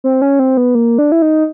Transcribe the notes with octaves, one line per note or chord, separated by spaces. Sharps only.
C4
C#4
C4
B3
A#3
D4
E4
D#4